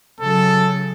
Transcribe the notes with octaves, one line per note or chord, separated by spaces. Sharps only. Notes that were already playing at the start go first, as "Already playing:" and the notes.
C#3 F#3 A4